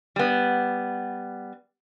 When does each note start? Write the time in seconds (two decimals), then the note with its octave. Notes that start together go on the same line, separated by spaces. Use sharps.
0.16 G3 B3